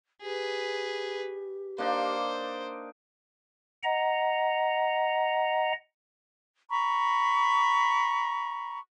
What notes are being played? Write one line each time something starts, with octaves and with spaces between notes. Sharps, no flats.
G4 G#4 B4
A#3 D4 D#4 C5
D#5 F#5 A#5
A#5 B5 C#6